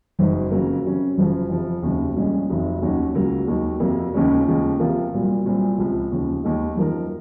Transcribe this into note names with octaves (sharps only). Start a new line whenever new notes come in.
F#1 F#2 D#3 G#3
F2 C#3 F#3 A#3
C3 F#3 C#4
F#1 F#2 C#3 F3
F2 C3 F3
F1 D#2 C#3 F#3
C2 A#2 F3 G#3 C#4
F1 F2 D#3 F#3
D#2 D#3 F#3 C#4 F#4
C#2 C#3 F#3 A#3
D#2 D#3 F#3
F2 C3 F#3 A#3
D#2 C#3 F3 G#3 C#4
D#2 C#3 F3 G#3
C3 F3 A#3 F4 A#4
C2 A#2 F#3
C2 A#2 F#3 C4
C#2 C3 F3
D#2 C#3 F3
D#2 D#3 G#3
F#2 F3 A#3 D#4 A#4